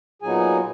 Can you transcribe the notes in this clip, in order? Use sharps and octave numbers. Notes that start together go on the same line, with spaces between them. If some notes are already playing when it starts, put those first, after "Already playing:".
A#2 F#3 B3 D#4 G#4 G#5